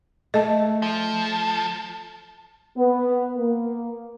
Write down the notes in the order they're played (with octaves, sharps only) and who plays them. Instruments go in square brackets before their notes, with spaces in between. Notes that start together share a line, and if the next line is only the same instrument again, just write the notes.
[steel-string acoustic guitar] A3 [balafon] D#5 A5
[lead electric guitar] F3
[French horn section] B3
A#3